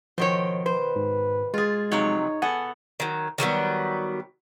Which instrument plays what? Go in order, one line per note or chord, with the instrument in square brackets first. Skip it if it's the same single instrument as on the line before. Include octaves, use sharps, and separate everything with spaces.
[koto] B2 D#3 G5 [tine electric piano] F3 [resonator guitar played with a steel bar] C5 C#5
[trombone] B4 [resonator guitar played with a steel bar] C5
[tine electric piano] G#2
[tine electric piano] G#3 A6 [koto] F4 G#4
[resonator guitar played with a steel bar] F2 C3 F#3 [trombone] D#4 [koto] C#5
[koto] B3 A4 [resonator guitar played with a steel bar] F#5 [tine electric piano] G#5
[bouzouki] D#3 F#3
D#3 F#3 G3 B3